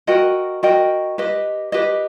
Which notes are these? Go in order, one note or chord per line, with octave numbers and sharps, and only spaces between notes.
F#4 A#4 D#5 G5
F#4 A#4 D#5 G5
G4 B4 D#5
G4 B4 D#5